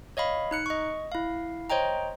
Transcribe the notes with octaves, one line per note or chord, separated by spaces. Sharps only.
C#5 D#5 F5 B5
D#4 F#6 C#7
D#5 C#6
E4 F5
C5 C#5 D#5 G5 A#5